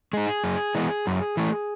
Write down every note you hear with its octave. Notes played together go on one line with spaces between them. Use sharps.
G#3 D#4 G#4
F#2
E3 G#3 B3
F#2
E3 A3